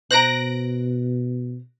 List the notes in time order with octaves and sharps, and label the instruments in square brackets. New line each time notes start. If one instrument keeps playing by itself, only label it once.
[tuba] B2 [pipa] C5 A#5 [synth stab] F#6 A#6 D7